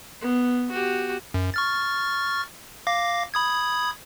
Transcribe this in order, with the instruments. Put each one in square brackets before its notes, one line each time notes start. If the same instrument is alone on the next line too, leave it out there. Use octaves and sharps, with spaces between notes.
[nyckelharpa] B3
F#4 G4
[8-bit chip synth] F#2
C#6 F6 A6
F5 D6 A#6
B5 D#6 G#6